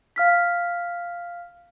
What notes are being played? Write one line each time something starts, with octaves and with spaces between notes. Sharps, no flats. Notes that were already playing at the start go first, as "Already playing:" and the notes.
F5 F6 B6